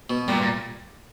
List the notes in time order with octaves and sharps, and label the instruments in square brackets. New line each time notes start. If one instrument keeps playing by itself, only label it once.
[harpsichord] B2
[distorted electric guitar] A#2 [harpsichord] G3
[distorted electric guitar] A#2